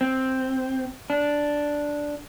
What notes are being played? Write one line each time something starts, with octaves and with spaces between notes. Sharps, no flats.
C4
D4